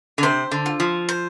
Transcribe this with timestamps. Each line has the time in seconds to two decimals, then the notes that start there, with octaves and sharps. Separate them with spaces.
0.18 D3
0.23 C3 C5
0.51 D3
0.66 F4
0.80 F3
1.09 C5